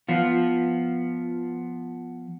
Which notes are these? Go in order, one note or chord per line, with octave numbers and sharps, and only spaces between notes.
F3 B3 F4